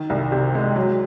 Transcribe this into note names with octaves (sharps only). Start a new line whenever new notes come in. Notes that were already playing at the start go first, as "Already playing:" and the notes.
Already playing: D#3
C2
C3
G#3
F#3